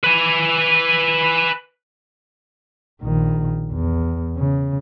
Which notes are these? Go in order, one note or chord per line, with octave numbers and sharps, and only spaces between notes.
B4 G#5
A#1 D#3
E2
C#3